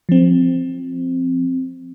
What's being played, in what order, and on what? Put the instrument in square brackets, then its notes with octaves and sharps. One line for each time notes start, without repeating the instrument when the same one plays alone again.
[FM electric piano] F3 C4